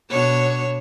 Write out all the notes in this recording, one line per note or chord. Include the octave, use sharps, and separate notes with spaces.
B2 D4 C#5